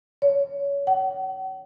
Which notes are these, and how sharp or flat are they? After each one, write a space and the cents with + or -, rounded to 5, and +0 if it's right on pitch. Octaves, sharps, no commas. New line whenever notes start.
C#5 +25
F#5 +45